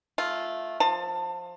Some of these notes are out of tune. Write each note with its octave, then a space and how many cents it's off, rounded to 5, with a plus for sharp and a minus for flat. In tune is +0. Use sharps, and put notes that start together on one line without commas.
A3 -10 F4 +0
F3 +10 A5 +25